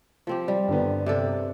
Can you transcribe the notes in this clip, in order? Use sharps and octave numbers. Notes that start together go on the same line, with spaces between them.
F3 C4 G4
G3
G1 D3 B3
C3 D4 A4